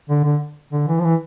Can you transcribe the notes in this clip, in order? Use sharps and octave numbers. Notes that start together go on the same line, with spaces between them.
D3
D3
D3
E3
F3
E3